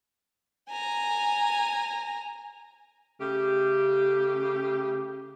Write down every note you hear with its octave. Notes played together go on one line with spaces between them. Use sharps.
G#5 A#5
C#3 A3 G4